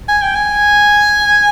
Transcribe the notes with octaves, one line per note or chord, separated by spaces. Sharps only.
G#5
G5
G#5